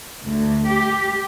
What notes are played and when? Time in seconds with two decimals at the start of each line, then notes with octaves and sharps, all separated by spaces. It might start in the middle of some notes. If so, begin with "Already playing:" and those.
0.23 D2
0.67 G4